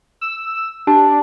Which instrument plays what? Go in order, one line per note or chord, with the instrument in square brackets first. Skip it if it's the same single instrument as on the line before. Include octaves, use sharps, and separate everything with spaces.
[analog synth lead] E6
[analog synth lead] D4 [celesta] G4 A5